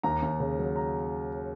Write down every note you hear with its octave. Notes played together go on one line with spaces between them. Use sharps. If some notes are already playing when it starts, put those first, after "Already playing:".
D#2 A#5
D#2
C#3
F#3
A#5